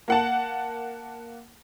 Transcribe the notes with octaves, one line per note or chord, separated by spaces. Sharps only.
A#3 F#5 A5